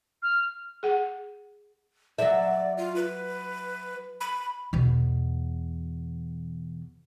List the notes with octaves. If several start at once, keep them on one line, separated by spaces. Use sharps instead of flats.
F6
G#4 F#5
F#3 D5 E5
F4
B4
B5
E2 B2